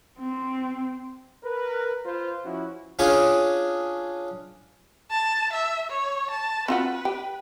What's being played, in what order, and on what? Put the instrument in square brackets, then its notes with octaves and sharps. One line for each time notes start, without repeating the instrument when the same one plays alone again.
[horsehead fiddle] C4
[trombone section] A#4 B4
F4 B4 C5
F3 C#4 E4 F#4
[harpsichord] C#4 D4 F4 G#4
[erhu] A5
E5
C#5
A5
[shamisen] C4 F4 F#4 [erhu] B4
[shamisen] G4